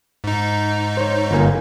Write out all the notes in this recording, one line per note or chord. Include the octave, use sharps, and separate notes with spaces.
G#2 D#4
C5 C#5
G1 A#3 G#5